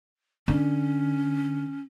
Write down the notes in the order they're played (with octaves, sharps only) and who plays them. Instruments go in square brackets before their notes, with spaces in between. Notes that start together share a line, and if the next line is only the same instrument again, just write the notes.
[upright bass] D3 [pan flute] C#4